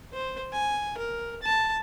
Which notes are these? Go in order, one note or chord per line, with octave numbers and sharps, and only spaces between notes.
C5
G#5
A#4
A5